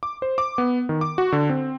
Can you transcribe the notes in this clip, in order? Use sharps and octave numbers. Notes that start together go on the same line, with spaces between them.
D6
C5
D6
B3
D#3
D6
F#4
D3
C4